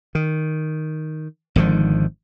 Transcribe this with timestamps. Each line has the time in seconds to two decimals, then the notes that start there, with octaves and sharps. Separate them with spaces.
0.15 D#3
1.56 G#1 D3 D#3 F3